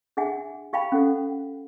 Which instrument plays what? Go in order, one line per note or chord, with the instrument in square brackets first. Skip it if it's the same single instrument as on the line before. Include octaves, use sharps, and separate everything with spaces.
[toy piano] D4 G#4 E5 F#5 G#5
G4 F5 G5 B5
C#4 A4 F#5